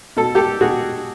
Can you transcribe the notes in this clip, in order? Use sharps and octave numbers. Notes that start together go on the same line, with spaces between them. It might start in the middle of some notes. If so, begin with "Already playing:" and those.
B2 A4
G4 A4
B2 F#4 G#4